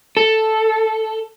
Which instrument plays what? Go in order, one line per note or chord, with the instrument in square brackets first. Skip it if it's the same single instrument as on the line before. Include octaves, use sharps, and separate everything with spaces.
[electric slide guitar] A4